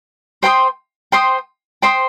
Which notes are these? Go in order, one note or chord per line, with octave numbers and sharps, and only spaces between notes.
C5 G5 C6 D#6
C5 G5 C6 D#6
C5 G5 C6 D#6